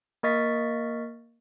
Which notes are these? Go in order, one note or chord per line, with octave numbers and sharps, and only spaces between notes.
A#3 A#4 D#5 C#6 A6 B6